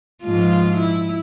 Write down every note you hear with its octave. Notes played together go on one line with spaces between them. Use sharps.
G#2 F3 F4
E4